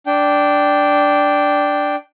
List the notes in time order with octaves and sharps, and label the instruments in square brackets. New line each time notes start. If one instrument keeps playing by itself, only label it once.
[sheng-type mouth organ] D4 G5